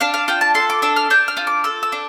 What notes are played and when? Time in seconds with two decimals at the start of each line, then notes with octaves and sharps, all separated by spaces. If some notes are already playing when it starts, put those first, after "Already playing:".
0.01 D4 F5
0.14 F5
0.28 F4 G5
0.41 A5
0.54 A4 C6
0.70 D6
0.82 D4 E6
0.96 F6
1.10 D4 G6
1.28 F6
1.37 F4
1.47 D6
1.64 A4 E6
1.83 E6
1.92 D4